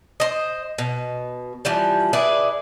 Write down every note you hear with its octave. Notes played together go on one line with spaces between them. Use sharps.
C5 D#5
B2
E3 F3 G3
E4 G#4 B4 D5